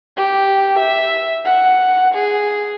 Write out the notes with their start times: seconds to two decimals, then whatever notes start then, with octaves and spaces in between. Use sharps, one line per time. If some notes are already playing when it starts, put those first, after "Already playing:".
0.17 G4
0.79 E5
1.45 F#5
2.15 G#4